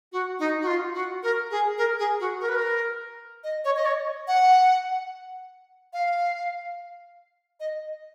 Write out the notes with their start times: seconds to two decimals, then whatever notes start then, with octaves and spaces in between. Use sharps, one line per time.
0.12 F#4
0.39 D#4
0.62 F#4
0.67 F4
0.95 F#4
1.23 A#4
1.51 G#4
1.78 A#4
1.99 G#4
2.20 F#4
2.41 A#4
2.48 B4
2.55 A#4
3.44 D#5
3.64 C#5
3.76 D#5
3.86 C#5
4.28 F#5
5.93 F5
7.60 D#5